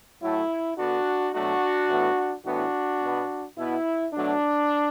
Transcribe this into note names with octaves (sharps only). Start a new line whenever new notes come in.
A2 F#3 A3 E4
D3 B3 D4 F#4
B2 F#3 A3 D4 F#4
A2 E3 B3
A2 E3 B3 D4 F#4
B2 B3
B2 B3 E4
B2 F#3 A3 D4